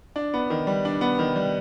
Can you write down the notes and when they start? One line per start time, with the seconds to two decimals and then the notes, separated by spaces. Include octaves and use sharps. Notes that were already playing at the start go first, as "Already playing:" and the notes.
0.16 D4
0.34 B3
0.50 D#3
0.67 G3
0.85 D4
1.01 B3
1.19 D#3
1.36 G3